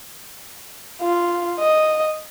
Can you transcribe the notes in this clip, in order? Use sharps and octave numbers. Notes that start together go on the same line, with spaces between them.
F4
D#5